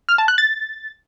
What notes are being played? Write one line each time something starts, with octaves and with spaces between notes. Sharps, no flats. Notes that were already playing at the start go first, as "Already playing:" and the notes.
F6
A5
F#6
A6